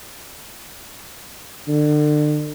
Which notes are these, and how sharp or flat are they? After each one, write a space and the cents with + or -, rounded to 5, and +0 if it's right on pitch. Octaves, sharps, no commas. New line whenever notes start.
D3 +35